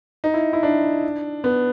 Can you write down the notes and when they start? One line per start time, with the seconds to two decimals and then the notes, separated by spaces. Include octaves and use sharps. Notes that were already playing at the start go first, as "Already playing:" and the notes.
0.24 D#4
0.34 E4
0.53 E4
0.63 D4
1.44 B3